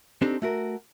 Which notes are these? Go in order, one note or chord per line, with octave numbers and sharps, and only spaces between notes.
C4 D4 D#4 G4 A4
A3 F#4 A#4